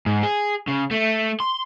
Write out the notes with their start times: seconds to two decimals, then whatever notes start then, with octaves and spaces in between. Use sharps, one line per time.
0.06 G#2
0.23 G#4
0.68 C#3
0.91 A3
1.40 C6